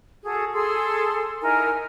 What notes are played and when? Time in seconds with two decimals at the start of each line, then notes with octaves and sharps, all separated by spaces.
0.23 F#4 G#4 A4
0.53 G#4 A4 C6 E6
1.41 D#4 E4 A#4 G#5